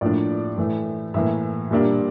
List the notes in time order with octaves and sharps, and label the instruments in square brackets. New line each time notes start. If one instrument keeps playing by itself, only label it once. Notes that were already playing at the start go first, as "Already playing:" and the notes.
[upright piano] A2 F3 A#3 D4 D5
A2 E3 A3
A2 E3 A#3 E5
A#2 G3 A#3 D4